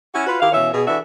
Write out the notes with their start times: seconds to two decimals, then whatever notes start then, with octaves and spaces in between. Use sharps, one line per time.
0.14 C#4 E4 F#4
0.26 F4 F#4 B4
0.40 D#3 E4 G4 F5
0.52 B2 E3 C#4 C#5 E5
0.73 B2 G#4
0.86 E3 D4 F#4 A4 E5